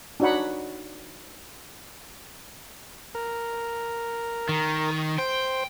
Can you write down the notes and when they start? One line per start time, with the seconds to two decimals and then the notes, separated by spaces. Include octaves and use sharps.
0.20 D4 D#4 F#4 C#5 F#5 B5
3.15 A#4
4.49 D#3
5.18 C5 G5